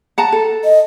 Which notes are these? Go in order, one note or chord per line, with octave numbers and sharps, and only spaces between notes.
F#5 A5 A#5
A4
D#5